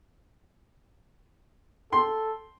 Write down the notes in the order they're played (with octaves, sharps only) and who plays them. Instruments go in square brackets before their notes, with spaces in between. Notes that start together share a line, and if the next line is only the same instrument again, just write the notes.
[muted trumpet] A4 [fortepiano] G5 C6